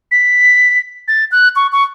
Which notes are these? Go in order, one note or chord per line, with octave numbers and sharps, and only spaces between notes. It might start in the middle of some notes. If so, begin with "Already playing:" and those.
B6
A6
F#6
C#6
C#6